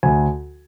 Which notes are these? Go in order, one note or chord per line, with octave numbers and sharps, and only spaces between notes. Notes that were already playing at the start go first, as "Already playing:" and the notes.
D2 G#5